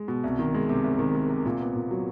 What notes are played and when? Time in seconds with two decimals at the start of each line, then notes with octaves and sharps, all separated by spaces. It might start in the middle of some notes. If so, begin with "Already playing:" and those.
Already playing: G#3
0.08 B2
0.24 C2
0.39 D#3
0.54 G#3
0.69 C3
0.84 C2
0.99 D#3
1.15 G#3
1.30 C3
1.45 A#2
1.60 B3
1.75 A#2
1.91 F#3